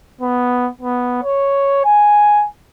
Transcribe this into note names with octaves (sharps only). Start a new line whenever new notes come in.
B3
B3
C#5
G#5